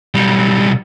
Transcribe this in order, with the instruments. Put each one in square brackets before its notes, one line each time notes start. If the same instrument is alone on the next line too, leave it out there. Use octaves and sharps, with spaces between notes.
[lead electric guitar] B1 G3